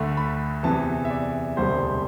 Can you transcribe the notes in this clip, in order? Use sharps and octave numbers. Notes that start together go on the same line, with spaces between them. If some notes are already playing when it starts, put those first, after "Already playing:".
Already playing: D2 D3 A3
B5
E2 C3 E3 A5
E5
D5
E1 D2 C3 G3 C5